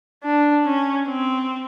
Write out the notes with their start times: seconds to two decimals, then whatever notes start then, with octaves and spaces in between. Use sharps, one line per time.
0.24 D4
0.66 C#4
1.08 C4